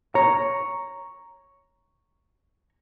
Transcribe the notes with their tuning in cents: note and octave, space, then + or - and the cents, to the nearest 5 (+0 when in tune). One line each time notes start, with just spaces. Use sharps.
C#5 +0 A#5 +0